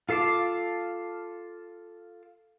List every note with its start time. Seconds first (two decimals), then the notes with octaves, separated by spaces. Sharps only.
0.09 F4 A4 F5 A5 D6